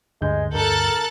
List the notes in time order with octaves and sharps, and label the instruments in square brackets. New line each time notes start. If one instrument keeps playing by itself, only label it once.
[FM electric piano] D2 D3 G6 [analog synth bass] G2 [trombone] G#3
[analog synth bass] G2 [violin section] A4 F#6 A6 [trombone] A#4